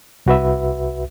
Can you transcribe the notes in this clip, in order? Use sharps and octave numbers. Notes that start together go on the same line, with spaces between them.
C2 F#4 B4 E5